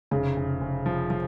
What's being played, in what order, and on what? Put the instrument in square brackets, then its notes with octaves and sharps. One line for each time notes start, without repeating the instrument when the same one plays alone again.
[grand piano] F1 [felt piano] C#3
[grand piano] F1
F1
F3
F3